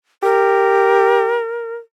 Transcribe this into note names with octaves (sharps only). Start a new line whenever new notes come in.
G4 A#4